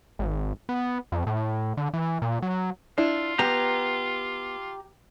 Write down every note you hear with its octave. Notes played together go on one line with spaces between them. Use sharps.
G#1
B3
F2
A2
D3
E3
A#2
F#3
D4 E4 F4
B3 G4 A#5